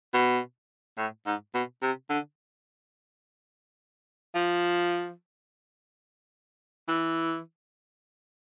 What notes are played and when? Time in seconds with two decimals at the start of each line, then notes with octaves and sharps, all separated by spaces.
0.14 B2
0.98 A2
1.26 G#2
1.54 B2
1.82 C3
2.10 D3
4.35 F3
6.88 E3